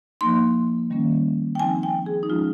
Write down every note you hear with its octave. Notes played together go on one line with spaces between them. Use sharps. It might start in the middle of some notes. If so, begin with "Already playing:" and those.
F3 A#3 D#4 C6
D#3 G3 A#3 C#4
G5
F3 C4 D#4 G#5
G5
G#4
D#4
F3 G#3 C#4 F4